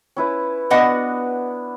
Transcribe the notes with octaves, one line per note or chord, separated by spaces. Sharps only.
C#4 E4 B4
B3 D4 F#4 D#5 F#5